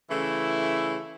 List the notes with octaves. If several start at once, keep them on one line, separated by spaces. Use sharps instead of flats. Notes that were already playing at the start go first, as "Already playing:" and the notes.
C#3 E3 A3 E4